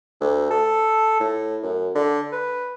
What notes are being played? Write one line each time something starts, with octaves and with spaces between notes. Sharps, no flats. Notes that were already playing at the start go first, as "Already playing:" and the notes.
D2
A4
A2
F#2
D3
B4